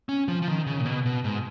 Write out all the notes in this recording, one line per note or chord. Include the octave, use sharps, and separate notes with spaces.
C#4
F3
F3
D#3
C#3
A#2
B2
B2
G#2